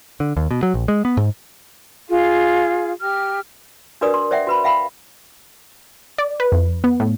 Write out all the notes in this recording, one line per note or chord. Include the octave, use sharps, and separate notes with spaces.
D3
D#2
B2
F#3
A#1
G#3
B3
G#2
F4 G#4 F5
G4 F6
D4 F#4 A#4 B4 D5 D#6
C6
C5 D5 E5 F#5 G5
F#4 B4 B5
E5 F5 G5 B5
D5
B4
F2
B3
A2